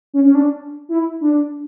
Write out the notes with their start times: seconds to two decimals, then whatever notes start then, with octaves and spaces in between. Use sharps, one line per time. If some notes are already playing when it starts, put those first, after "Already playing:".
0.14 C#4
0.26 C#4
0.35 D4
0.89 E4
1.21 D4